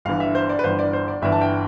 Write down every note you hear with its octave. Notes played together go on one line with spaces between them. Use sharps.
G1 G2 E3 F5
E5
C5
D5
B4
G1 G2 E3 C5
D5
C5
D5
G1 G2 E3 E5
A5
G5